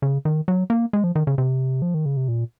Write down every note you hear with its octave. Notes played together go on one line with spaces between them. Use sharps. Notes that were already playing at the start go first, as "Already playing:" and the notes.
C#3
D#3
F#3
A#3
G#3
F3
D#3
C#3
C3
F3
D#3
C#3
C3
A#2